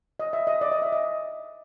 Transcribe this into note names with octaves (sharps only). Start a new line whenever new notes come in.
D#5
E5
D#5
D5
D#5
E5
D#5